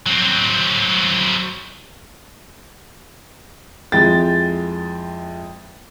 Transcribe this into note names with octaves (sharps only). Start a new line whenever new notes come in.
F#3 C4
F2 G#3 E4 G5 A6